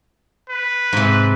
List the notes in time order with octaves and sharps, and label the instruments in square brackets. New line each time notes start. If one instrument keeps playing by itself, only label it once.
[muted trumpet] B4
[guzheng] G#2 C3